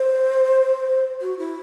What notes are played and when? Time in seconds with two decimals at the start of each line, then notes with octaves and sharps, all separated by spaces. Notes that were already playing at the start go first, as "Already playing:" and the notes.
Already playing: C5
1.21 F#4
1.39 E4